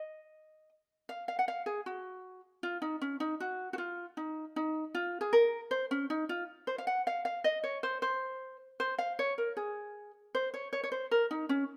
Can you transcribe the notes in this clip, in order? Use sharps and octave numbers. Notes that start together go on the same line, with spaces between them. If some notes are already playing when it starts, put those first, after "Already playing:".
Already playing: D#5
F5
F5
F#5
F5
G#4
F#4
F4
D#4
C#4
D#4
F#4
F#4
F4
D#4
D#4
F4
G#4
A#4
C5
C#4
D#4
F4
C5
F5
F#5
F5
F5
D#5
C#5
C5
C5
C5
F5
C#5
A#4
G#4
C5
C#5
C#5
C#5
C5
A#4
D#4
C#4